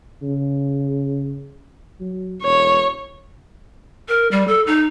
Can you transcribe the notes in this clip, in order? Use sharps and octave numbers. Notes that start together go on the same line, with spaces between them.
C#3
F#3
E1 C#5
A#4
G3
A4
D#4